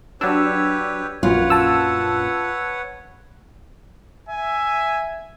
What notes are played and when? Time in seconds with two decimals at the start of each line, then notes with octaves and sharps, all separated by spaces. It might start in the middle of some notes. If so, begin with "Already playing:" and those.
0.21 F#3 D4 G4 B4 C#5 E6
1.23 A#1 F#2 A#2 F4 B4 C#5 F#5
1.50 A5 E6
4.29 E5 G#5